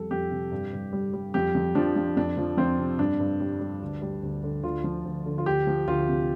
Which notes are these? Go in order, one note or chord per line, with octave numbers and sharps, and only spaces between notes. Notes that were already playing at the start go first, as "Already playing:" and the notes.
Already playing: F2 G3 A4
F2 G4
C3
G2
G2
G3
G3
F2 G4
F2
F3 D4
F3
F2 D4
F3
F2 C4
C3
G2 D4
G2
G3
G3
D2
G3
D2
D3
D2 F4
F3
D2
D3
F4
D2 G4
F3
D2 F4
C3